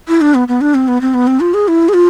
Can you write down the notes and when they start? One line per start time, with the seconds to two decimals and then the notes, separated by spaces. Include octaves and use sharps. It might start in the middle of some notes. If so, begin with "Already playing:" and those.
0.08 E4
0.21 D4
0.35 B3
0.48 B3
0.61 D4
0.75 C4
0.88 B3
1.01 C4
1.14 B3
1.27 C4
1.40 F4
1.54 G#4
1.68 E4
1.89 G#4
1.94 F4